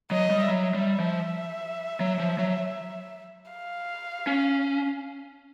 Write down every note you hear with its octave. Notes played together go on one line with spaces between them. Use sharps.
F#3 D#5
G3
F#3 E5
G3
F3
F#3
F3
F#3
F5
C#4